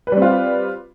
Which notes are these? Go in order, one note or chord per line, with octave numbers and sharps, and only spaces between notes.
G3 C4 F4 B4